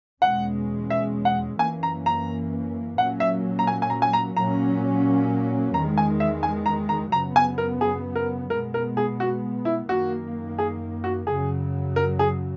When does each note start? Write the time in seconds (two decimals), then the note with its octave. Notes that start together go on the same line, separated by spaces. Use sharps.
0.22 E2 B2 G#3 C#4 F#5
0.90 E5
1.25 F#5
1.59 F#2 E3 A#3 C#4 G#5
1.83 A#5
2.06 A#5
2.98 A#2 F#3 A#3 C#4 F#5
3.20 E5
3.59 A#5
3.67 G#5
3.82 G#5
3.90 A#5
4.02 G#5
4.13 A#5
4.36 A#2 F#3 A#3 C#4 A#5
5.74 E2 D#3 G#3 A#5
5.98 G#5
6.20 E5
6.43 G#5
6.66 A#5
6.89 A#5
7.12 F#2 C#3 F#3 B3 A#5
7.36 G#5
7.58 A#4
7.81 G#4
8.16 A#4
8.50 B2 G#3 B3 A#4
8.74 A#4
8.97 G#4
9.20 F#4
9.65 E4
9.88 F#2 D#3 A#3 F#4
10.58 G#4
11.04 F#4
11.27 F#2 C#3 F#3 G#4
11.96 A#4
12.19 G#4